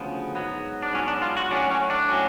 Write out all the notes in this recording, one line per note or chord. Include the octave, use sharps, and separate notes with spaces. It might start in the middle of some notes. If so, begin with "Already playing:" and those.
Already playing: D2 C#3 F3 B3
G#2 F#3 B3
D4
G#2 F#3 B3 C#4
D4
F4
F#4
A2 F#3 C#4 D4
C#4
D4
A2 F#3 C#4